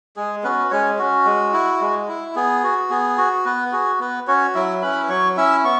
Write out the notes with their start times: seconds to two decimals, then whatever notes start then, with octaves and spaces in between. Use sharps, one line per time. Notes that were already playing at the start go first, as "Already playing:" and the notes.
0.16 G#3 G#4
0.44 B3 C#4 F#4 B4
0.71 G#3 C#4 C#5
0.99 C#4 F#4
1.26 G#3
1.53 E4
1.81 G#3
2.08 E4
2.35 B3 G#4
2.64 F#4
2.90 B3 G#4
3.18 F#4
3.45 B3 B4
3.72 F#4 G#4
4.00 B3 B4
4.28 C#4 F#4 C#5
4.55 F#3 E4 E5
4.82 C#4 E4 B4 B5
5.09 F#3 C#5 C#6
5.37 C#4 E4 E5 E6
5.64 B3 C#6